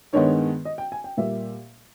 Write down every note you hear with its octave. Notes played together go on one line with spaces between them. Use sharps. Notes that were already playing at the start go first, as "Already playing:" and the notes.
G2 D#3 G#3 B3 C#5
D#5
G5
G#5
G5
A#2 G3 A#3 E5